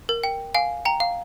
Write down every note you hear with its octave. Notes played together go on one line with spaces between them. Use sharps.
A#4
G5
F5 G#5
G5 A#5
F5